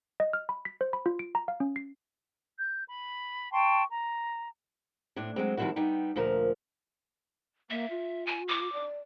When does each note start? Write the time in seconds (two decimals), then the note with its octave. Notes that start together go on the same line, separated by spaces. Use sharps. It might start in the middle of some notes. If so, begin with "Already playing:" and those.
0.20 D#5
0.33 F6
0.49 B5
0.65 B6
0.81 C5
0.93 B5
1.06 F4
1.19 D7
1.35 A#5
1.48 F5
1.60 C#4
1.76 C7
2.59 G6
2.88 B5
3.52 G5 A5 C6 C#6
3.90 A#5
5.16 A2 C4 D4
5.36 F#3 G#3 C4
5.57 D#3 F3 G3 C4 E4 F#4
5.76 G3 B3 D#4 G5
6.16 D2 A#2 F3 A#4
7.70 A#3 E5
7.90 F4
8.27 G#5
8.48 D6
8.73 D5